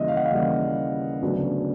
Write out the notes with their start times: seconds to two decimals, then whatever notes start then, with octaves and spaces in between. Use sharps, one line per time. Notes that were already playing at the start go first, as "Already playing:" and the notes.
Already playing: D#2 C#3 E3 G3 D#5 E5
0.08 F5
0.17 F#5
0.25 F5
0.31 D#2 C#3 E3 G3
1.22 D2 C#3 F#3 B3 D4